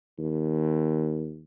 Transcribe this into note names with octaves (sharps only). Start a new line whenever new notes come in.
D#2